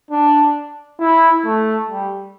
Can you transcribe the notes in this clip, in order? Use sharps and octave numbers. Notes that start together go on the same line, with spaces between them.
D4
E4
A3
G3